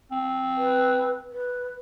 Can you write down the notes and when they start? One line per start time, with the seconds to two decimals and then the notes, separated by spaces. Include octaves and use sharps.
0.11 C4
0.57 B4
1.31 B4